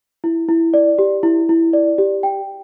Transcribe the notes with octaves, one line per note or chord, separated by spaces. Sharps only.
E4
E4
D5
G4
E4
E4
D5
G4
G5